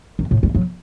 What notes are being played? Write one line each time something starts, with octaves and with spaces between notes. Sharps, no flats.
F#2
A2
G3
F#3